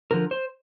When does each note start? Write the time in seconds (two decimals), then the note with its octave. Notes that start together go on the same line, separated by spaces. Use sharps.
0.11 D3 F3 A#4
0.31 C5